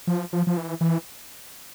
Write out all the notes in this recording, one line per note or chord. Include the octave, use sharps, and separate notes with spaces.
F3
F3
F3
E3
E3